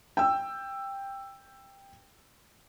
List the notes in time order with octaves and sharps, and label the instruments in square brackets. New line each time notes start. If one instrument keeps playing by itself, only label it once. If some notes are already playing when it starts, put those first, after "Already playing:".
[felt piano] G5 E6